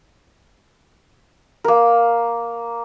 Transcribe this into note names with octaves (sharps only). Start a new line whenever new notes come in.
A#3 A#4